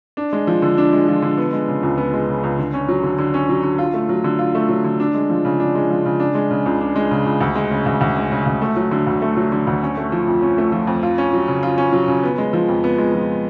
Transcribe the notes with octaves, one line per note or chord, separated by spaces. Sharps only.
D4
G#3
F3
D3
D4
G#3
F3
D3
B3
G#3
C#3
C#2
B3
G#3
C#3
C#2
D3
C#4
F#3
D3
D3
C#4
F#3
D3
F4
A3
F#3
D3
F4
A3
F#3
D3
D4
G#3
F3
C#3
D4
G#3
F3
C#3
D4
G#3
C#3
C#2
D4
G#3
C#3
C#2
D2
G#3
C#3
D2
D2
G#3
C#3
D2
A3
F#3
D3
D2
A3
F#3
D3
D2
C#4
A3
F3
F2
C#4
A3
F3
F2
F4
C#4
F#3
C#3
F4
C#4
F#3
C#3
B3
G#3
F3
F2
B3
G#3
F3